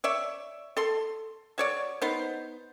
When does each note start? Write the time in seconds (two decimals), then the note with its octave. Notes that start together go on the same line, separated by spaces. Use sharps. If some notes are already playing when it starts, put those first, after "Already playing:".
0.04 C#5 D5 E5
0.77 A4 C6
1.58 F#3 C#5 D5
2.02 B3 D#4 C5